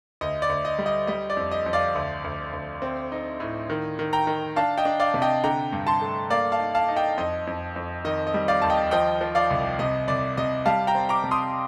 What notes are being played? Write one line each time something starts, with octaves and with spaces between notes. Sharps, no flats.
D2 D#5
D5
D2
D#5
G3
D#5
G3 D#5
D5
F2
D#5
F2
D5 F5
D2
D2
D2
C4
D#4
A2
D#3
D#3
G5 A#5
D#3
D4 F5 A5
D#5 G5
D4
D5 F5
C3
D#5 G5
D3 G5 A#5
G2
A5 C6
A3
A#3 D5 F5
F5 A5
D#4
F5 A5
D#4
D#5 G5
F2 D#5
F2
F2
D#3 D#5
D#5
G3
D5 F5
D#2 A5
D#5 G5
F3 D#5 G5
F3
D5 F5
C2
C3 D#5
C2 D5
C3 D#5
G3 F5 A5
G5 A#5
C4
A#5 D6
C3
C6 D#6